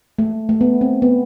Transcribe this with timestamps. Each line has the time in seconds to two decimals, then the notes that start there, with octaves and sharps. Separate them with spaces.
0.19 A3
0.49 A3
0.61 B3
0.81 C4
1.02 B3